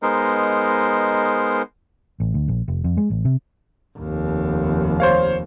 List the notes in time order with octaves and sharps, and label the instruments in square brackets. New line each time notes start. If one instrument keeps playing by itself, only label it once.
[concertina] G#3 B3 D#4 A#4 C5
[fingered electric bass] A1
D2
A#1
F1
F2
G#3
A1
C3
[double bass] F1 D#2
[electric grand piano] C5 C#5 F5